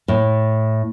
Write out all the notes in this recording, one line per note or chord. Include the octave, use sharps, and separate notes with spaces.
A2